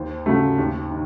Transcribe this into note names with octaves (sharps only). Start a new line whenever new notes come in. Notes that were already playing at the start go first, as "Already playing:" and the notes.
Already playing: D#2 C5
C#3 F#3 A3
D#2
D#3